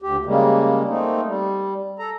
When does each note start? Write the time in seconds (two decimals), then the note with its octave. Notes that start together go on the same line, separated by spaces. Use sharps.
0.02 D2 G4
0.26 C#3 G3 G#3 A#3
0.89 A3 A#3 C4 D#4
1.26 G3
1.99 A4 A#5